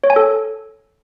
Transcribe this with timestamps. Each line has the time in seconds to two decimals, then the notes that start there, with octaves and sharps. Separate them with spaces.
0.04 C#5
0.10 G#5
0.16 A4